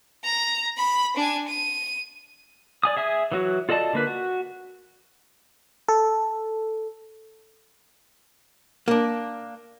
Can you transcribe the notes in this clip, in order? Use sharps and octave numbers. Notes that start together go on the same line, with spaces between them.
A#5
B5
D4 G#5
D#7
D5 G#5 D#6
G#4 E5 G#5 D#6
E3 F#3 F#4
F4 A4 D5 D#5 A5
D3 A#3 B4
F#4
A4
A#3 D4